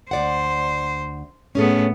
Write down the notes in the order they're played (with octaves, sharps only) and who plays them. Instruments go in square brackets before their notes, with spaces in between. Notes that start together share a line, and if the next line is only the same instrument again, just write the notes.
[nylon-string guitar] D2 D5 F#5 [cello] C5
[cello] A2 B3 [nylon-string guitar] C#4 G#4 A4